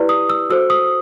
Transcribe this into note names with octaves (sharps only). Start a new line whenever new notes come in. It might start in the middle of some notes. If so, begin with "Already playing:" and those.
Already playing: E4 G4 B4 D5
D#6
E6
F#4 A4 C5 E6
D#6